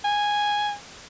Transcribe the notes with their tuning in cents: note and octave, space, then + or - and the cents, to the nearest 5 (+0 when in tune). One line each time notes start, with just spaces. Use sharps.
G#5 -5